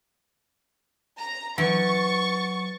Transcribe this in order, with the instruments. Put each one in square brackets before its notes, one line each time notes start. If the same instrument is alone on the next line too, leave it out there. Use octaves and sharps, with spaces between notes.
[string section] A#5
[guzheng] E3 [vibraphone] F#3 [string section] C#6 A6